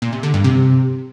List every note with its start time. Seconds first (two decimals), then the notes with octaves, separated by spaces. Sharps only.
0.02 A#2
0.13 C3
0.23 D3
0.34 G2
0.44 C3